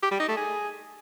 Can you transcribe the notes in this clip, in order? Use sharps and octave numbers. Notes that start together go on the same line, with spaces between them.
G4
G3
D#4
A3
G#4